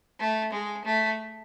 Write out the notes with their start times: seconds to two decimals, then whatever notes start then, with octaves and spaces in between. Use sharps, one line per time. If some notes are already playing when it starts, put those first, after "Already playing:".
0.20 A3
0.52 G#3
0.85 A3